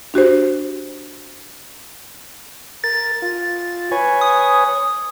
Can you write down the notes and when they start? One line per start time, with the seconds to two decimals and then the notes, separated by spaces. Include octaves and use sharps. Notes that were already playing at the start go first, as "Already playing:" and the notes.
0.14 D4 F#4 G4 C5
2.84 A#4 A6
3.22 F4
3.91 B4 C#5 G#5
4.21 D#6